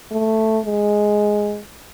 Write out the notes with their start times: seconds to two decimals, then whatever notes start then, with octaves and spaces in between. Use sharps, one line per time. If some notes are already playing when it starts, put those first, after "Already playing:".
0.11 A3
0.65 G#3